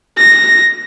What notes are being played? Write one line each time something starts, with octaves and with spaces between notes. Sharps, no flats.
A#6